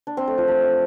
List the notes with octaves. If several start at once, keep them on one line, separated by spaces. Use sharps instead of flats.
D4
C4
A3
F3
A3